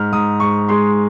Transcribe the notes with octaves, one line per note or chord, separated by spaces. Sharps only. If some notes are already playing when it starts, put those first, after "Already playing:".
Already playing: G#2 F6
G#2 D#6
G#2 C#6
G#3 C6